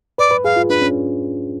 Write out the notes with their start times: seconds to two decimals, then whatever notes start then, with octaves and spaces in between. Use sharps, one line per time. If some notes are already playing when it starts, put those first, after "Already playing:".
0.18 B4 D5
0.31 B4
0.44 G#4 F5
0.56 F4
0.69 D4 B4
0.82 C#4